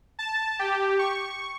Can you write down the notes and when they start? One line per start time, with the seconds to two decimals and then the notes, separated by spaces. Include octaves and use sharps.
0.19 A5
0.59 G4
0.99 C#6